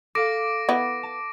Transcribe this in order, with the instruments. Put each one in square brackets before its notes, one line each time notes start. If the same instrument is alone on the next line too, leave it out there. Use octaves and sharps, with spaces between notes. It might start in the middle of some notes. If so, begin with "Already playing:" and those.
[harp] A4 F5 [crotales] D6 A#6 D7
[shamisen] B3 E4
[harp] A5